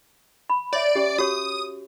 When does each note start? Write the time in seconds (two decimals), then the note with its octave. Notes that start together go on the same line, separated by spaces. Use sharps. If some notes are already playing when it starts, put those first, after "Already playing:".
0.50 B5
0.73 C#5 D5 E5
0.96 C#4 G4
1.19 F#4 G4 C#5 D#6